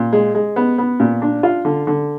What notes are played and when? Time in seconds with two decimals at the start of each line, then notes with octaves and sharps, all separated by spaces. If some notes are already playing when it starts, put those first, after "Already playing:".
Already playing: A#2
0.13 G#3
0.35 G#3
0.56 B3
0.78 B3
1.00 A#2
1.22 D4
1.43 F4
1.65 D3
1.87 D3